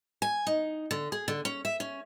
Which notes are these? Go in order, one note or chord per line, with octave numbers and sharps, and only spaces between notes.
G#5
D#4
D3
G#4
D3
C#4
E5
C#4